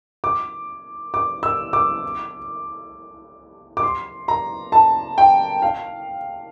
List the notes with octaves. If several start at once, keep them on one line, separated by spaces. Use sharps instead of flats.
D6
D6
E6
D6
D6
C6
A#5
A5
G5
F5